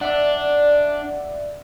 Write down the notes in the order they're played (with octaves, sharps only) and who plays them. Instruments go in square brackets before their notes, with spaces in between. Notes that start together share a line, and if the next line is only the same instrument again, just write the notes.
[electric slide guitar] D4 [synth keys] D5 E5 F#5